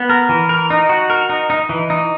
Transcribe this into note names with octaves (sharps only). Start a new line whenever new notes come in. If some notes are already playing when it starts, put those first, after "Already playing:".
Already playing: B3
A#4
E3
A#4
D#4
F#4
A#4
D#4
D#4
E3
D#4